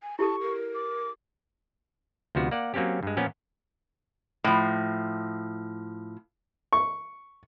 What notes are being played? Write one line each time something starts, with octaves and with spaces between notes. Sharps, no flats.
G#5
E4 G4 A4 A5 C#6
A#4
D6
D2 C3 F3 B3 F#4
A#3 D5 F#5
F#3 A#3 C4 C#4 G4
G2 G#3
A#2 F3 B3 C#4
A2 F3
C#6